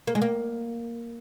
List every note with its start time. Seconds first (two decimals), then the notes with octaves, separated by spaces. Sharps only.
0.07 A#3
0.15 G#3
0.22 A#3